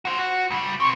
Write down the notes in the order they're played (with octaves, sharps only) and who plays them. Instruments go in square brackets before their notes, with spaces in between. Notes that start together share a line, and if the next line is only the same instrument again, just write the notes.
[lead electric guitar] F#4 C5
F#4
C#2 G3
[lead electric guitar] B2 C4 [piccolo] C#6